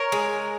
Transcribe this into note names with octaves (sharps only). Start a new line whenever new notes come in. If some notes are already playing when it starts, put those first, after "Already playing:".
Already playing: A#4 C#5
G#3